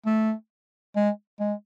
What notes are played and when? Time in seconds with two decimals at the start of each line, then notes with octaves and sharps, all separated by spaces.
0.06 A3
0.96 G#3
1.40 G#3